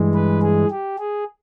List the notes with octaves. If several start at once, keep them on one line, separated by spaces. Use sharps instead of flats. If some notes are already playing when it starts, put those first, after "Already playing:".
Already playing: G2 E3 G#3
B4
G#4
G4
G#4